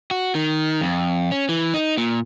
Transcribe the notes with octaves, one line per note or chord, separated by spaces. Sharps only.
F#4
D#3
F2
C#4
E3
D#4
A#2